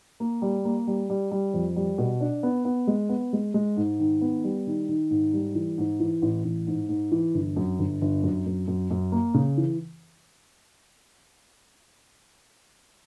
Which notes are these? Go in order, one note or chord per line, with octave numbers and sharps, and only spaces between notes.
A#3
G3
A#3
G3
G3
G3
F2
G3
B2
D4
B3
B3
G#3
B3
G#3
G#3
G#2
D#3
B3
G3
D#3
D#3
G#2
G3
E3
G#2
E3
A1
A1
G#2
G#2
E3
G1
F#2
G1
G1
F#2
F#2
F#2
F#2
A#3
C#3
E3